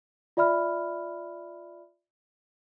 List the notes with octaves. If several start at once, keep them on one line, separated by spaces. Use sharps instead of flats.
F4 D5 E5 B5 F6